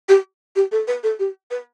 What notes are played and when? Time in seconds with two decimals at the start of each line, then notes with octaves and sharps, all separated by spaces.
0.09 G4
0.56 G4
0.72 A4
0.87 B4
1.03 A4
1.19 G4
1.51 B4